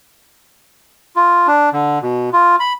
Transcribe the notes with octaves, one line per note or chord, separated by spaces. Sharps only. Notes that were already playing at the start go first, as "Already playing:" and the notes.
F4
D4
D3
B2
F4
B5